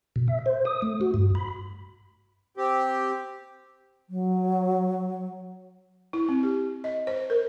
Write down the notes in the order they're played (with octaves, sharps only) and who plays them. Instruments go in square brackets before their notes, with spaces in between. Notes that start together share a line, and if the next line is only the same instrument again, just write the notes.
[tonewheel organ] B2
E5
C5
D#6
A3
F#4
G2
B5
[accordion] C4 G4
[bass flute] F#3
[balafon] E4
C4
G4
D#5
C5
A#4